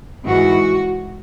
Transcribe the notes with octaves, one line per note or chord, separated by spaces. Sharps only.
G#2 E3 F#4